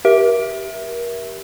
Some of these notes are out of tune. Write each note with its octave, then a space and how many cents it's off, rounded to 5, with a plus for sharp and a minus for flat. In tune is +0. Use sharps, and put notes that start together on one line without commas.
G4 -10 A#4 +30 E5 +0